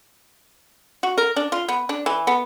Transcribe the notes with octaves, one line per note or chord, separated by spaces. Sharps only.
F#4
A#4
D4
F4
B3
D4
E3
B3